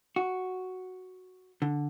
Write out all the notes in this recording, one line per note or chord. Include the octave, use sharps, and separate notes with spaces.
F#4
D3